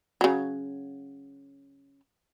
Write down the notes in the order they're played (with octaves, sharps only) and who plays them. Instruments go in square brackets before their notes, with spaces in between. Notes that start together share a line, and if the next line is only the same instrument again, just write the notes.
[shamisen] C#3 F#3